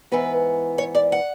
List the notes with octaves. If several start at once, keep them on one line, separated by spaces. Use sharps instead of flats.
G#2 E3 B3 B4
C#5
D5
F#5